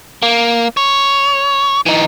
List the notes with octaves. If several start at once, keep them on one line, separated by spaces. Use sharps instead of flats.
A#3
C#5
E3 D#4